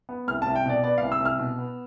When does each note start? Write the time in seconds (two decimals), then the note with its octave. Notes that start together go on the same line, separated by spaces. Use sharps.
0.09 B3
0.28 C2 F6
0.42 A5
0.47 C2
0.55 G5
0.65 B2 D5
0.84 B3 D5
0.98 C2 F5
1.12 E6
1.21 C2 F6
1.39 B2
1.58 B3